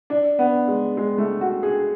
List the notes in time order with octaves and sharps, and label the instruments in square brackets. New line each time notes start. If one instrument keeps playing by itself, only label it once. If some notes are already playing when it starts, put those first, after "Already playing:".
[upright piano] D4
B3
G#3
G#3
A3
F#4
G#4